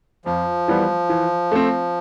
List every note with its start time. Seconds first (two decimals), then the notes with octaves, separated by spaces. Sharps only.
0.25 F2 F3
0.68 E3 G3 B3
1.09 E3
1.52 A3 C4